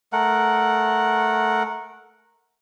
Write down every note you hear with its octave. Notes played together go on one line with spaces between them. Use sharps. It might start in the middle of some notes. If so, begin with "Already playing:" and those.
A3 A#4 F#5